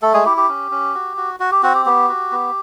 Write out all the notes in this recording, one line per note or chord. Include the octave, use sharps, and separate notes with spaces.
A3 A4
G#3 G#4
E4 G4
G4
C#4
C#4
F#4
F#4
F#4
G4
C4 F#4
G4
B3 G4
F#4
B3